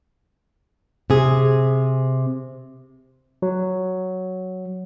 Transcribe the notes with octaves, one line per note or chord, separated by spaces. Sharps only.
C3 G#4
F#3